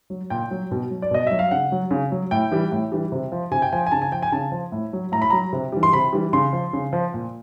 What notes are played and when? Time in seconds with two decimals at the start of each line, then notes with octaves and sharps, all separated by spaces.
0.10 F#3
0.30 A#2 G5
0.51 F#3
0.71 B2
0.91 F#3
1.02 D5
1.11 B2 D#5
1.27 F#3 E5
1.39 F5
1.51 C#3 F#5
1.72 F#3
1.91 C#3
2.11 F#3
2.31 A2 G5
2.52 E3 G3
2.72 A2
2.92 E3 G3
3.12 C3
3.32 F3
3.52 C3 G#5
3.62 G5
3.73 F3 G#5
3.87 G#5
3.92 C#3 A5
4.02 G#5
4.12 F3 G5
4.23 G#5
4.32 C#3 A5
4.52 F3
4.72 A2
4.93 F#3
5.12 A2 A#5
5.22 B5
5.30 F#3 A#5
5.53 C3
5.72 E3 G3
5.83 C6
5.93 C3 B5
6.13 E3 G3
6.33 C#3 C6
6.53 F3
6.73 C#3
6.93 F3
7.14 A#2